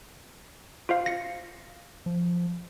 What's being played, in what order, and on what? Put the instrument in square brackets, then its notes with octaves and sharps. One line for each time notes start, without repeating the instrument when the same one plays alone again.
[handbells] F4 C5 F5
A#6 C#7
[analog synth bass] F3